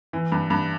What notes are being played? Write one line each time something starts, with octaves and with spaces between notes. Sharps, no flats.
E3
G2
G2